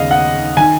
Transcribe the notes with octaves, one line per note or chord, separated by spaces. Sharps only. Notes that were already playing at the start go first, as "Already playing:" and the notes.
Already playing: D#2 C#3 D#5 F5
F#5
D#3 G#5